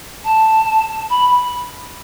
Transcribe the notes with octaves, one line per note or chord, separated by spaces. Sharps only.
A5
B5